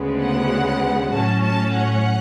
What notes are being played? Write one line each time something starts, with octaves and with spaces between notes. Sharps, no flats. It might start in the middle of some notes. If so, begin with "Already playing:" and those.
Already playing: D2 C#3 G#3 B3
F#5
A2 F#3 C#4 A5
A5
F#5